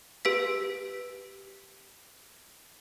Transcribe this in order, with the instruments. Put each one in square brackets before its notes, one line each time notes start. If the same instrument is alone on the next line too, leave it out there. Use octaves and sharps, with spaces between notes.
[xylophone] G4 B4 B6